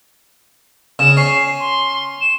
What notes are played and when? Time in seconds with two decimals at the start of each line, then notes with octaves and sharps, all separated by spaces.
0.99 C#3 E7
1.17 C#4 C7
1.59 C6
2.21 E7